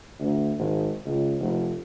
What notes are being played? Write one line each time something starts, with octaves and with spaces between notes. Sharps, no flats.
D2
G#1
C#2
F1